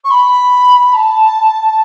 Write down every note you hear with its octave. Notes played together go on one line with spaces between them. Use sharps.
C#6
B5
A5